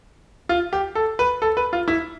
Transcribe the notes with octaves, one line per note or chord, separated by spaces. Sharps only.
F4
G4
A4
B4
A4
B4
F4
E4